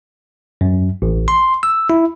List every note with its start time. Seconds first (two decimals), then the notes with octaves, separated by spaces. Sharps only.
0.61 F#2
1.02 A1
1.28 C6
1.63 E6
1.90 E4